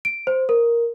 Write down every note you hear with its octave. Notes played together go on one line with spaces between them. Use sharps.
D7
C5
A#4